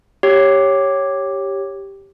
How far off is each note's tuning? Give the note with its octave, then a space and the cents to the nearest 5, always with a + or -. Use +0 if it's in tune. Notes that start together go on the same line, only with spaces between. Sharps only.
G4 +0 C#5 -5